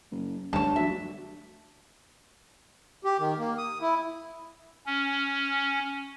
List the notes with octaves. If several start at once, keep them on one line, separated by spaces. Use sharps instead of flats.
F#1
G2 D3 A3 C#5 A5
F#3 D4 F#4 E5
G4
D#3
A#3
D#6
E4
C#4